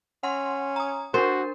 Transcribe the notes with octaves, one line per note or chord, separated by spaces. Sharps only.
C#4 F#5 C6
A#5 D#6
D4 F#4 A#4 C5